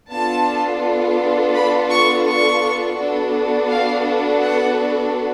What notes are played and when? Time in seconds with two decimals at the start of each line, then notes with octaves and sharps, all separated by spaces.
0.10 B3 D4 F4 A4 A5
1.54 B5
1.89 C#6
2.26 C#6
2.97 B3 D4 F#4 A4
3.69 F5
4.41 F#5